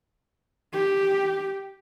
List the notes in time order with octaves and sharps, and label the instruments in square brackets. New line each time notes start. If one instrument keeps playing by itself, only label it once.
[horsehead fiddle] G4